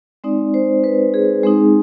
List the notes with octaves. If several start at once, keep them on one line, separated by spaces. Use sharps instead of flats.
G#3 C4 D#4 D5
C5
B4
G#4
G#3 C4 D#4 G#4